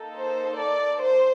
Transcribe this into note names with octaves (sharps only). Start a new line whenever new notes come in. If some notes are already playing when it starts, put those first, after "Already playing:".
Already playing: A#3 D#4 A4
C5
D5
C5